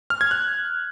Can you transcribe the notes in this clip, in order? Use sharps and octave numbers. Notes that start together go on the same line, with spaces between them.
F6
G#6
F#6